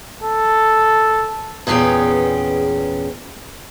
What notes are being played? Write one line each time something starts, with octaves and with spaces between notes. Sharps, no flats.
A4
E2 A#2 B3 C#4 G#4 G5